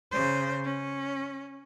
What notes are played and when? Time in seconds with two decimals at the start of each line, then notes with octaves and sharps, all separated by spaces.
0.12 C#3 C5
0.64 C#4